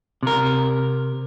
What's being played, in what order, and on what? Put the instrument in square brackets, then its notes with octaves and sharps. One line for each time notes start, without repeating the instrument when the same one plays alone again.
[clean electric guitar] C3 A#4